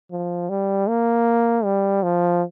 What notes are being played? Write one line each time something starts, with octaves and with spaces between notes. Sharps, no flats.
F3
G3
A#3
G3
F3